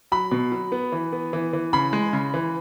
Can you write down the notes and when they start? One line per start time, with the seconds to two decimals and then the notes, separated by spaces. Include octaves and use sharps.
0.12 F#3 B5
0.32 B2
0.52 F#3
0.72 B3
0.92 E3
1.12 B3
1.33 E3
1.53 E3
1.73 C#3 B5
1.93 G#3
2.13 C#3
2.34 E3